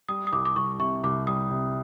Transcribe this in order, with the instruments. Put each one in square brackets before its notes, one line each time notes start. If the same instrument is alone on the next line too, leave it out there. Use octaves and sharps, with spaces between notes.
[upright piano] G3 [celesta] D#6
[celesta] D#6
[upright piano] C2 [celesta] D6
[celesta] D6
[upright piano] C2 [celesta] C#6
[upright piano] C3 [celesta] C#6
[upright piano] C2 [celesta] D6
[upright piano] G3 [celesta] D#6
[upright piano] C3